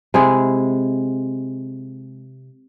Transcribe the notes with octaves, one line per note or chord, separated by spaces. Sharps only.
C3 G#3 E4 G#4